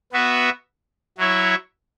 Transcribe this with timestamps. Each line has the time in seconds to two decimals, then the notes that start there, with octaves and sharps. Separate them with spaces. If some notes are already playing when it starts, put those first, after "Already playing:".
0.13 B3 F#4 B4 E5
1.18 F#3 E4 C#5 E5